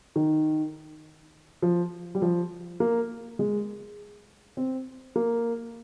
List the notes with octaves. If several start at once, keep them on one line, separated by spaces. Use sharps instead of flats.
D#3
F3
G3
F3
A#3
G#3
C4
A#3